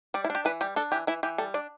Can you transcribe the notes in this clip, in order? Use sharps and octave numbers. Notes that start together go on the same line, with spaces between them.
G3 D5
E4
D4
G4
E3 B4
G3 G4
D4 A4
E3 G4
E3 E4
E3 G4
G3 A4
D4 D5